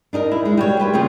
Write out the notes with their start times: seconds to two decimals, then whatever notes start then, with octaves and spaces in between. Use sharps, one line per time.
0.13 D4 D#4 A4 A#4
0.31 E4
0.45 G#3
0.57 G3 F#4 C#5
0.79 G4 B4 C5
0.93 D#2 C#3 C4 F4 G#4